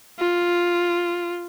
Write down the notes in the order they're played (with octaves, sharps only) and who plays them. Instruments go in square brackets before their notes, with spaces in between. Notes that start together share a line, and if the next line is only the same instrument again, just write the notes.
[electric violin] F4